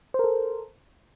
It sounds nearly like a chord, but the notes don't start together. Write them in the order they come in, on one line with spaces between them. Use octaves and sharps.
C5 A#4 A4